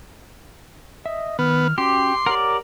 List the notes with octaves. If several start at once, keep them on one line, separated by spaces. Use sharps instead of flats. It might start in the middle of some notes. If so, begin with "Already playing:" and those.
D#5 E5
D#3 B3 F6
C#4 F#4 G4 C6 D6
G4 A#4 C#5 D5 F#5